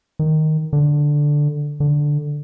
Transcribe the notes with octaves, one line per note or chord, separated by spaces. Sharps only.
D#3
D3
D3